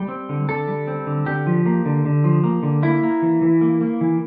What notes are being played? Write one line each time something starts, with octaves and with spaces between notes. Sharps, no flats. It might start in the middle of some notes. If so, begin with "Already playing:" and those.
Already playing: G3 G5
C4
D3
D3 A4
G3
C4
D3
D3 G4
F3
A#3
D3
D3
F3
A#3
D3
A#3 E4
A#3
E3
E3
A#3
A#3
E3